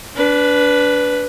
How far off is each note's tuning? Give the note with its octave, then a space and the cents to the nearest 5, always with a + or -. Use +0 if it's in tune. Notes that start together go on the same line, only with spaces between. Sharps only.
D4 -20 B4 +0